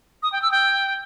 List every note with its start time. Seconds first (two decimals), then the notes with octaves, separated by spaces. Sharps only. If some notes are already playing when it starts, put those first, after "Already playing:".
0.23 D#6
0.32 G5
0.42 E6
0.52 G5